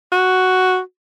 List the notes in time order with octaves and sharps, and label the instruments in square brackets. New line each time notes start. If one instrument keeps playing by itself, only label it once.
[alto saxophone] F#4